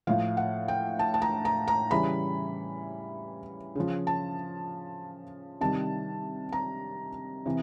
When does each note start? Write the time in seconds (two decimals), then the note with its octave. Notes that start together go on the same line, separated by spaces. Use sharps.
0.07 A2 F3 F5
0.37 F#5
0.68 G5
0.99 A5
1.14 A5
1.22 A#5
1.45 A#5
1.68 A#5
1.91 C#3 E3 G3 B5
3.75 C#3 F3
4.07 A5
5.61 C3 D#3 G3 A5
6.53 A#5
7.46 C3 E3